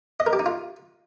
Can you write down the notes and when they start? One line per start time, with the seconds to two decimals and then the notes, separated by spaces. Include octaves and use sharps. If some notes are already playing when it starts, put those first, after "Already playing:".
0.20 D#5
0.26 A#4
0.33 G4
0.39 D#4
0.46 F4